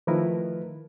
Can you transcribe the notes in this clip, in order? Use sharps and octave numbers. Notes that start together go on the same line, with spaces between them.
D#3 F3 A3 E4 A#4 B4